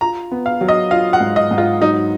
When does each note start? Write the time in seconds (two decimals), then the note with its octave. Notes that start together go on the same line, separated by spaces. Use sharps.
0.01 F4 A#5
0.31 B3
0.46 F5
0.61 F#3
0.68 D#5
0.91 F4 F5
1.13 F#5
1.20 G#2
1.36 D#5
1.51 G#2
1.58 F4
1.81 F#3 D#4